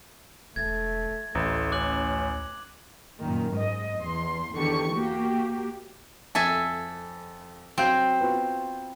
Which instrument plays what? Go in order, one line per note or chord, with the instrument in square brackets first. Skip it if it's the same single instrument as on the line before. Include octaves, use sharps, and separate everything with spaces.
[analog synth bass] E1 [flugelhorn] A3 [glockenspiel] G#6 A6
[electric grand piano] A1 [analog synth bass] D2 [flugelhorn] A3
[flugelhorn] C#4 [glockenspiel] D6 F#6 F#7
[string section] F#2 A#2 D#3
G#2 D#5
E2 C6
E2 D3 D#3 G4 C#6 C#7
A#3 F#4 G4
[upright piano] F2 A5 [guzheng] A4 E5 G#5
[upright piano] F#3 F5 G6 [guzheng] C4
[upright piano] B3 F4 F#4